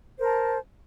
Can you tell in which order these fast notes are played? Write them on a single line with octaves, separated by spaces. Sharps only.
C5 A#4 A5